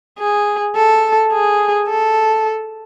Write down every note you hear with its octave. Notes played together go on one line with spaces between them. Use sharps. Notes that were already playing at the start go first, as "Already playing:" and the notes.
G#4
A4
G#4
A4